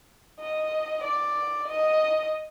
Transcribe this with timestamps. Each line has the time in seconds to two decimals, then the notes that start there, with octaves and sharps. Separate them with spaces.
0.40 D#5
1.04 D5
1.68 D#5